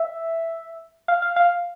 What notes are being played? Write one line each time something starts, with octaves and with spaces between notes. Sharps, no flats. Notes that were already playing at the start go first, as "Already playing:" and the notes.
Already playing: E5
F5
F5
F5